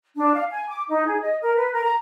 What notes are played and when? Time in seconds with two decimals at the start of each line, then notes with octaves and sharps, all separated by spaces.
0.16 D4
0.34 F5
0.50 G#5
0.68 D6
0.88 D#4
1.07 G#4
1.22 D#5
1.42 A#4
1.56 B4
1.72 A#4
1.85 A#5